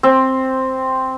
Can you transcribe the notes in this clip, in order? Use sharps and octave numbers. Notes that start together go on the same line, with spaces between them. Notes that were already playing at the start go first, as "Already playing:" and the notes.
C4